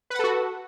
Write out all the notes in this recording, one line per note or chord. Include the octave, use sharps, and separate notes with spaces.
F#4 A4 B4 F#5